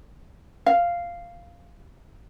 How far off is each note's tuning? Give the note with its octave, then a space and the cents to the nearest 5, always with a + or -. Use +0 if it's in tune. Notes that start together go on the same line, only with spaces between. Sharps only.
F5 -5